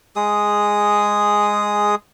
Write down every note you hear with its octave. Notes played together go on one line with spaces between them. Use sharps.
G#3 G#4 D#6